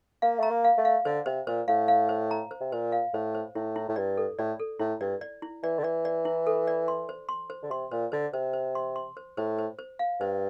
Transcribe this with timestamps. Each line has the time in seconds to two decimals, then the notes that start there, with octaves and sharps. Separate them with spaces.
0.22 A#3 F5
0.39 A3 A#5
0.50 A#3
0.64 F5
0.78 A3
0.85 F5
1.05 D3 C5
1.26 C3 C5
1.47 A#2 C5
1.68 A2 F5
1.88 F5
2.09 C5
2.31 A#5
2.51 C5
2.60 C3
2.72 A#2 C5
2.92 F5
3.13 A2 C5
3.35 C5
3.55 A2 E4
3.76 E4
3.89 A2
3.96 G2 D5
4.17 A4
4.39 A2 D5
4.59 A4
4.79 A2 E4
5.01 G2 D5
5.21 D5
5.42 E4
5.63 E3 D5
5.79 D3
5.84 E3 D5
6.05 D5
6.25 E4
6.47 A4
6.67 D5
6.88 C6
7.09 C5
7.29 C6
7.50 C5
7.62 D3
7.71 C3 C6
7.91 A#2 C5
8.12 D3 C5
8.33 C3 C5
8.53 C5
8.75 C6
8.96 C6
9.17 C5
9.37 A2 C5
9.59 C5
9.79 C5
9.99 F5
10.20 G2 C5